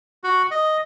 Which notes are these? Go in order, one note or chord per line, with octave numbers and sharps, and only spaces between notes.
F#4
D#5